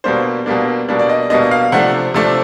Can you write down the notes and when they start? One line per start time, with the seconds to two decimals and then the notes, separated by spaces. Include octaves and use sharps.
0.04 B2 G3 A#3 D4 C5
0.46 B2 G3 A#3 D4
0.89 B2 G3 A#3 D4
0.99 D5
1.09 D#5
1.30 B2 G3 A#3 D4 D#5
1.51 F5
1.72 C3 F3 A3 D4 F#5
2.14 C3 F3 A3 D4